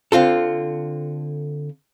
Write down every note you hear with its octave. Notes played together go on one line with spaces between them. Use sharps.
D3 C4 F4 A4